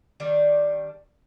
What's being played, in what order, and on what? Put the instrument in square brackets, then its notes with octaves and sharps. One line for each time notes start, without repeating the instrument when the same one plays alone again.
[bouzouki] D#3 G3 D4